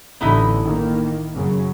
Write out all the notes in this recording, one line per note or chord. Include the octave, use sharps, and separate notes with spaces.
A1 D3 B3 D#4 E4
D#3 A#3
F#2 C#3 F#3